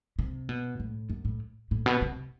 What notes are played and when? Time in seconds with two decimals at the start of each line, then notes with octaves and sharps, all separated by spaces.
0.19 C3
0.49 B2
0.80 A2
1.10 F#2
1.25 A2
1.71 A2
1.86 B2
2.02 C3